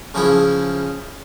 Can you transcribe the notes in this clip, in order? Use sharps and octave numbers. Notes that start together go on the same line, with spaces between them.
C#3 F3 E4 G#4